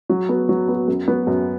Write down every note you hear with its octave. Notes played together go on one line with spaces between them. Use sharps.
F#3
B3 F#4
F#3
B3 F#4
F#2
F#3 B3 F#4
F#2